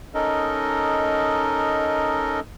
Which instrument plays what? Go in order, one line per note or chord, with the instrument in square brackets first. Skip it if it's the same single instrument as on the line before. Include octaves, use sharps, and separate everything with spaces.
[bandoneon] C#4 D#4 A4 A#4 D#5